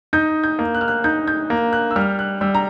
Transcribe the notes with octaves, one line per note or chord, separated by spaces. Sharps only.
D#4 G6
G6
A#3
F#6
F6
F#6
D#4 G6
G6
A#3
F#6
E6
G3 F6
F#6
G3 E6
A#5